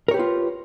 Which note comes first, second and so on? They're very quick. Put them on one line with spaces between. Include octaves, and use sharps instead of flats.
A#4 C#5 G4 B4 F4